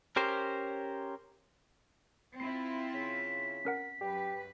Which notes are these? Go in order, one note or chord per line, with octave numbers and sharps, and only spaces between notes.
C#4 G4 A#4 C5
C4 E4 F4 B5 C7
C#3 B6
C#4 A#4 F#5
F#2 G4 B4